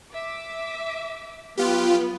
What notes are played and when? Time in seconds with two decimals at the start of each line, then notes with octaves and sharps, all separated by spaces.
0.12 E5 D6
1.57 F#3 B3 F4 G4